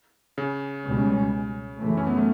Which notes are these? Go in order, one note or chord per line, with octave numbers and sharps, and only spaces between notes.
C#3
C#2 B2 G3 C#4
F#2 C#3 E3 A3
C#4
B3
A3